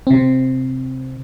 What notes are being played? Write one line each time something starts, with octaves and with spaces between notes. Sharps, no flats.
C3 C4